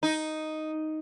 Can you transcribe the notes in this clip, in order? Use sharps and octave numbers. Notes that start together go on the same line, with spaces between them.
D#4